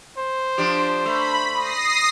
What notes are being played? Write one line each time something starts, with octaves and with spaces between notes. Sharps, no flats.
C5
F3 D4 G4
A3 B5
D#6 A#6 C7